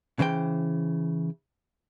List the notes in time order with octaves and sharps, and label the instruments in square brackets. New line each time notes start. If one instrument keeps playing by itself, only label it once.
[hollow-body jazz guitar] C#3 E3 C5 G5